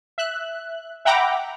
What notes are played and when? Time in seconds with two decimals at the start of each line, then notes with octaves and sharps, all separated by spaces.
0.18 E5 F#6
1.05 E5 F#5 G5 A#5 B5 D6